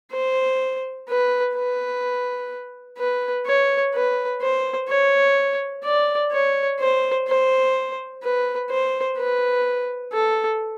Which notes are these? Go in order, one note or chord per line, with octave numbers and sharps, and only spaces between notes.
C5
B4
B4
B4
C#5
B4
C5
C#5
D5
C#5
C5
C5
B4
C5
B4
A4